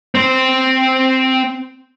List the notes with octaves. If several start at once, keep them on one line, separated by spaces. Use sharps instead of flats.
C4 C5